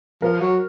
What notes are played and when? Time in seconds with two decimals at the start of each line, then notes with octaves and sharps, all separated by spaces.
0.22 F3 A#4
0.41 F#3